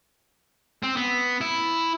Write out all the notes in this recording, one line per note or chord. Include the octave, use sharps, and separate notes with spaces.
C4
B3
E4